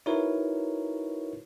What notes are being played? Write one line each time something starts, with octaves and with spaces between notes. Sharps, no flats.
D#4 E4 F#4 A#4 B4 C#5